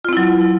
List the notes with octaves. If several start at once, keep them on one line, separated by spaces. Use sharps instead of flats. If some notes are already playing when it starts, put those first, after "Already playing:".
F#3 C4 E4 F4